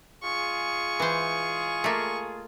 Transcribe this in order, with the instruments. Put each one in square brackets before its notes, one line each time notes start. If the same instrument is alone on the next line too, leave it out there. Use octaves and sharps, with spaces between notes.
[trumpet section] G#3 F4 G#4 [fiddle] C#6
[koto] E3 C5
A3 A#3